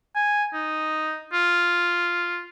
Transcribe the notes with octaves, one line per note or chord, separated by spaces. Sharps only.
G#5
D#4
F4